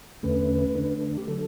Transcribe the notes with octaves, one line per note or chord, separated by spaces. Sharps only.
E2 D3 A3 C#4 B4
D3 A3 D4
G4
D3 F#3 A4